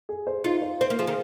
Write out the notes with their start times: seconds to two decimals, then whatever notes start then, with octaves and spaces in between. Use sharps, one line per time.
0.09 G#4
0.27 C5
0.44 D#4 F4
0.62 C5
0.81 C4 C5
0.90 A#3
0.99 F3 G#4
1.07 D#3